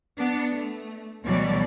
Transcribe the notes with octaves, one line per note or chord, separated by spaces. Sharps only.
B3 D4
A3
D2 B2 E3 F#3 G3 D5